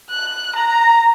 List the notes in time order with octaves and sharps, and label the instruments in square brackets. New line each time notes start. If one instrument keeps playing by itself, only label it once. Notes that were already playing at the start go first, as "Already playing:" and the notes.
[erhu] F#6
A#5